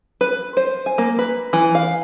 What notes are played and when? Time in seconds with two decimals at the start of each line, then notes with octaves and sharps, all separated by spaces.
0.21 B4
0.57 C5
0.86 G#5
0.98 A#3
1.19 B4
1.53 E3
1.75 F5